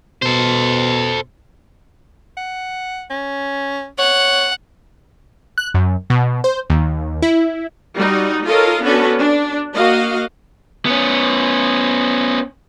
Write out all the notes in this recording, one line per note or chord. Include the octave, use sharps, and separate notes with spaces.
B2 A4 C5
F#5
C#4
C#5 F#5
F#6
F#2
B2
C5
D#2
E4
G3 D#4 F#4
F4 A4 A#4 C#5 D#5 F5
B3 C#4 D4 F#4 A4 B4
D4
A#3 F#4 D#5 F5
B3 C#4